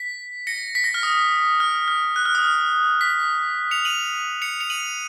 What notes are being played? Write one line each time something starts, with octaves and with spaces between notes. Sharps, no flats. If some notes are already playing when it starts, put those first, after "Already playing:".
Already playing: B6
A#6 C#7
B6
A#6
F6
D#6
F6
F6
F#6
F6
D#6
F6
B6
C#7 F7
D#7 F#7
C#7 F7
C#7 F7
D#7 F#7